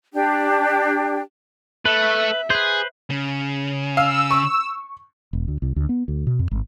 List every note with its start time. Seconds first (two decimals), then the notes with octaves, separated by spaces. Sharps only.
0.13 D4 G4 G5
1.86 A3 B4 E5
2.50 G#4 B4 C5
3.10 C#3
3.97 F5 E6
4.31 C#6
5.33 E1
5.48 D2
5.62 C2
5.76 D2
5.89 B3
6.08 D2
6.27 B2
6.39 F2
6.51 G#1